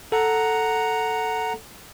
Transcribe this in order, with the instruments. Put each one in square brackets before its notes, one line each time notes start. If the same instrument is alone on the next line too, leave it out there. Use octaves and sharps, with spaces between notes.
[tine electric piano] A4 [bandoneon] F#5 A#5